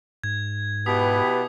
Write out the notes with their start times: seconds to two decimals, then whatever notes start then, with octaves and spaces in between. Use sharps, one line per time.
0.24 G#2 G#6
0.86 B2 E4 G4 B4 D#6 B6